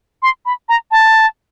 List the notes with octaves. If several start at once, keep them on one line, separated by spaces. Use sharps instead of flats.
C6
B5
A#5
A5